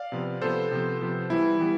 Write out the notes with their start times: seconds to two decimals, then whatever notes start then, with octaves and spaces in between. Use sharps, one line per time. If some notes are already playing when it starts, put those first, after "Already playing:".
Already playing: D5 F5
0.12 C3 F3 B3
0.41 C3 F3 B3 A4 C5
0.71 C3 F3 B3
1.01 C3 F3 B3
1.30 E3 G3 B3 E4
1.60 E3 G3 B3